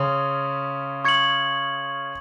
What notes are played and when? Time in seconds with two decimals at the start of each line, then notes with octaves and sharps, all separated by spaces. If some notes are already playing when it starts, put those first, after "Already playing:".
Already playing: C#3 C#4 C6 D#6
1.05 C#6 G#6 C#7 F#7